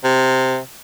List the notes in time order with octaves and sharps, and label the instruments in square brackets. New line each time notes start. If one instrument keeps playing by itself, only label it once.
[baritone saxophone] C3